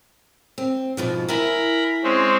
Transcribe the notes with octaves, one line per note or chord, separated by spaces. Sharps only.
C4
G#2 B2 F3
E4 A#4 E5 G#5 B5
G#3 C4 C#4